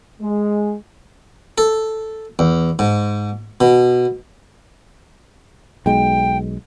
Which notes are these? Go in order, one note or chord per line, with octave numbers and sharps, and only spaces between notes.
G#3
A4
E2
G#2
B2
B1 G#3 G5